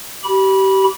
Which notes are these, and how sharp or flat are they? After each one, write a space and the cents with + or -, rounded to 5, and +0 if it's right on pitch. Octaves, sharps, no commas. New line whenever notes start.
G4 -30 B5 -20